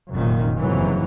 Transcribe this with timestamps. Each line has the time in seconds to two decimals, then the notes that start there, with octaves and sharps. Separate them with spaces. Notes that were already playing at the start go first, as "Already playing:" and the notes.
0.11 F1 F#2 A#2 D#3
0.58 F#1 F2 G#2 C3 E3 F#3